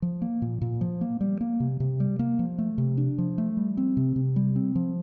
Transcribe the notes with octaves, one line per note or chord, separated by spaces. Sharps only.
F3
A#3
A#2
A#2
F3
A#3
G3
A#3
C3
C3
G3
A#3
F3
A3
C3
D4
F3
A3
G3
C4
C3
C3
G3
C4
F3